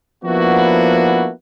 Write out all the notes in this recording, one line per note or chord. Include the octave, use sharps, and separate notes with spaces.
F3 A#3 B3 D4 E4 F#4